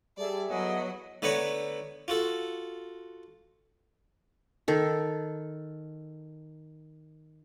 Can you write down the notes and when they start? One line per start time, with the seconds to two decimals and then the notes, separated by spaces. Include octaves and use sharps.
0.18 G3 G#4 A4 D5 E5
0.50 F#3 B3 E4 F#4 C#5 D#5
1.22 D3 A3 B3 B4 C#5 A#5
2.08 F4 F#4 A4
4.68 D#3 A4